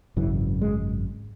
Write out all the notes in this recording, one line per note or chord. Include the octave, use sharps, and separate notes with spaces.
G#1 F#2 C#3 E3
G#3